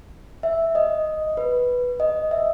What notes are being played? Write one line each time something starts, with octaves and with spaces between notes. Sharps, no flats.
E5
D#5
B4
D#5
E5